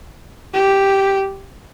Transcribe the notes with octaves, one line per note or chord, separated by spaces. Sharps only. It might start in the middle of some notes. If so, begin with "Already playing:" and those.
G4